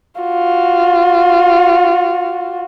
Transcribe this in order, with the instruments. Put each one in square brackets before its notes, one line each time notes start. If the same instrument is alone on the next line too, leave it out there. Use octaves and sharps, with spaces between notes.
[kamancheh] F4 F#4